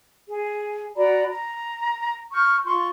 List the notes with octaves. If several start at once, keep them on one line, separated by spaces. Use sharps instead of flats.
G#4
F#4 D5 A#5 B5
A#5
C#6 F6 G6
F4 C6 C#6